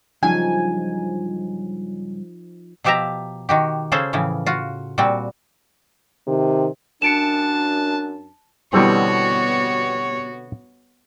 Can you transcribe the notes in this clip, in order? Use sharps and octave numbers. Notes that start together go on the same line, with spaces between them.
G2 C#3 F3 F#3 D#4 G#5
B2 F3 G4 E5 A5 A#5
D#3 F#4 G4
C#3 C#4 G#4 A4 C5
A2 C#3 E3 F3
F4 F#4
A#2 G3 C4 F#4
C3 D#3
F#2 D4 A5 C#7 D7 E7
B2 D3 E3 G3 B3 C4 F#4 C#5